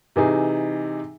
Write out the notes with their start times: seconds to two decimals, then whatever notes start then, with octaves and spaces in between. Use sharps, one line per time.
0.16 C3 E3 D#4 G#4